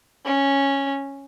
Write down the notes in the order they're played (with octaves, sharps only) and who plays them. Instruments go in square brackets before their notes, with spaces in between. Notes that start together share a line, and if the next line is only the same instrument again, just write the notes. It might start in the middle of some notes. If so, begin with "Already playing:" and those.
[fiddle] C#4